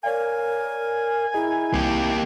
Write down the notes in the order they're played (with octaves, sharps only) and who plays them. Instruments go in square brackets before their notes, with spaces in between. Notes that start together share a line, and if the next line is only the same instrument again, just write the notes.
[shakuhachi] A#4 [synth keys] C#5 D5 F5 [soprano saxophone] G#5
[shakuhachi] E4 [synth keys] G#4 D#5 A#5
[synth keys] C2 G3 C4 [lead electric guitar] A#3 G4